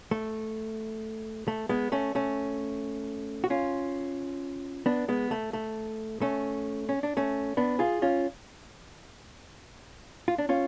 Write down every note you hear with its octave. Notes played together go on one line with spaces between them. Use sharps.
A3
A3
G#3 B3
A3 C#4
A3 C#4
F#4
C#4 F4
B3 D4
G#3 B3
A3
A3
A3 C#4
C#4
D4
A3 C#4
B3 D4
F4 G#4
C#4 F4
F4
D4
C#4 F4